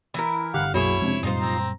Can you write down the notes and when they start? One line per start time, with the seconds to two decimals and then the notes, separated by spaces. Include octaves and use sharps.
0.14 E3 E4 A#4
0.54 G1 D3 G4 F5 F#5
0.74 B1 F#2 B2 F#3 A#3 E4 G#4 C#5
1.02 F2 C3 G#3 C#4 D4
1.23 F#2 A#2 G3 D#4 F4 C5
1.40 C4 A#5